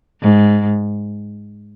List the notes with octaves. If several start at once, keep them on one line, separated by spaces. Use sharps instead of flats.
G#2